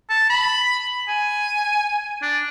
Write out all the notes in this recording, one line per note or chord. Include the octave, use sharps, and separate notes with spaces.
A5
B5
G#5
D4